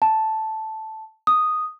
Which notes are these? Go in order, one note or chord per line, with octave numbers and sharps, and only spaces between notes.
A5
D#6